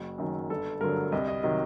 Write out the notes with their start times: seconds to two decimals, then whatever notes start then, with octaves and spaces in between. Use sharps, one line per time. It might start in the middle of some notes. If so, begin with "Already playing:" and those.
Already playing: F#1 F#4
0.18 F#2 D#3 F#3
0.50 G1 A4
0.81 G2 D3 F#3 A#4
1.12 C2 D#5
1.28 D#5
1.43 C3 D#3 F#3 D#5